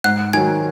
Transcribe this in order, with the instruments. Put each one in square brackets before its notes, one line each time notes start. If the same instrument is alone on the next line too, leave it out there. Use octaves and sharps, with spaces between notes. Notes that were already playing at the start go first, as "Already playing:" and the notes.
[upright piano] G#2 [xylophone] F#5 F#6
[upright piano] D#3 F#3 [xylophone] G#5 G#6